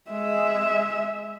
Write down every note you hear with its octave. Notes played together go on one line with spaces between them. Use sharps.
G#3 E5